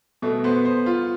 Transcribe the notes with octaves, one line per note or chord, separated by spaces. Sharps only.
B2 A3
B3 C5
C5
F4